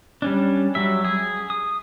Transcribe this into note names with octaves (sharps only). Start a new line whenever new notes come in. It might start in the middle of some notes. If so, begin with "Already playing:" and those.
G3 C#4 D4
F#3 G3 E5
G#4
D#6